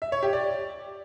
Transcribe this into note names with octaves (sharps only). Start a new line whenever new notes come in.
E5
C#5
G4
D5